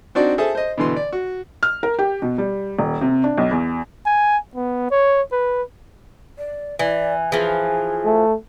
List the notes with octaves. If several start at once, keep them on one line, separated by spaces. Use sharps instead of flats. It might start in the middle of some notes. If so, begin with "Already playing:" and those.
C4 D4 D#4 F#4 D5
G#4 A4 C5 E5 A5
C5 D#5
B2 D3 E3 C6
D5
F#4
F6
A#4
G4
B2
G3
D#1
C3
D4
B1
E2
G#5
B3
C#5
B4
D5
E3 D5
E3 F3 G#4
A3